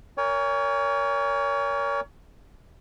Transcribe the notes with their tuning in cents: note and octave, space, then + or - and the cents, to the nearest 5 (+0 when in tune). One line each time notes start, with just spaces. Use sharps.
A#4 +0 C#5 +30 G#5 -35